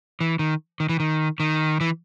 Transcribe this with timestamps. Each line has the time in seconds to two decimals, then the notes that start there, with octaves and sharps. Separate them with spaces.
0.21 E3
0.39 D#3
0.80 D#3
0.89 E3
1.00 D#3
1.40 D#3
1.81 E3